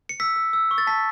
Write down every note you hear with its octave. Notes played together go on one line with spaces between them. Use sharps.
C#7
E6 B6
E6
E6
C#6
A6
A5 B6